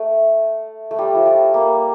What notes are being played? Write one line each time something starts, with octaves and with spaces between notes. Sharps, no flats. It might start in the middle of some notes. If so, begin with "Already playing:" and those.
Already playing: A3
A3
G3
F3
G3
A#3